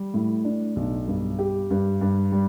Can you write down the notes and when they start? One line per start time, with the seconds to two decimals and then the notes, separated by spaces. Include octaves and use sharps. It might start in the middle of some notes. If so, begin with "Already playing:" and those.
Already playing: G3
0.14 A2
0.45 D4
0.76 B1
1.08 G2
1.39 G4
1.71 G2
2.01 G2
2.32 G3